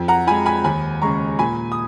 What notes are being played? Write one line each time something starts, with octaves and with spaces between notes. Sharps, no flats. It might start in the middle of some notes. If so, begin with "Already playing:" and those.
Already playing: F2
F#5 A#5
F3 G#3 G#5 B5
G#5 B5
D#2 G#5 B5
C#3 G#3 A#5 C#6
A#2 G#5 B5
D#6